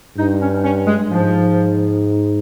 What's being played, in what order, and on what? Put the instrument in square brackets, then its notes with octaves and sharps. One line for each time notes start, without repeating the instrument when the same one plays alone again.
[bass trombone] G2 [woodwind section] D#4
[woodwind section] C#4
C#4
G#3
[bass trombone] G#2 [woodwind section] F3